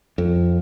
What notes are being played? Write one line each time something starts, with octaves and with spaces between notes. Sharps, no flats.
F2